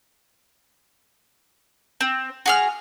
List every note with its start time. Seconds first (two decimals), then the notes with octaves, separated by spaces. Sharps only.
2.01 C4
2.46 F#4 G#4 F6